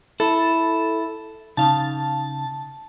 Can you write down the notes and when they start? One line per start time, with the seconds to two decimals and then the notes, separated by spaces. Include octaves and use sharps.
0.20 E4 A4
1.57 C#3 D#4 F5 A5